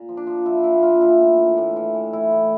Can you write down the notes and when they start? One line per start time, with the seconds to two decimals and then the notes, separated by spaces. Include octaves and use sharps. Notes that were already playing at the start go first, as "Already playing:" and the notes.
Already playing: A#2
0.09 F3
0.17 D4
0.27 F3
0.46 F3 E4
0.64 A#2 E4
0.82 A#2 F4
1.01 E3 E4
1.20 A2
1.39 A2
1.58 A2
1.76 E3
1.94 E3
2.13 A2 E4
2.32 A2